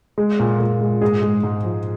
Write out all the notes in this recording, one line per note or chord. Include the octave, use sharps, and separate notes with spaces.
G#3
A#2
A#2
G#3
G#2 G#4
G#3
G#2
F3